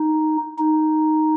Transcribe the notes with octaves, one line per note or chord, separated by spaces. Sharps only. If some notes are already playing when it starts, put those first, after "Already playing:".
Already playing: D#4
D#4